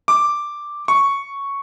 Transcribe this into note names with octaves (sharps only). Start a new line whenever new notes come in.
D6
C#6